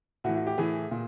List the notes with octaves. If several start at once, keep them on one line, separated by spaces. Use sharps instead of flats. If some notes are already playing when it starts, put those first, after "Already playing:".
A2 E3 F#4
F#4
G4
A2 E3 G#4
A#2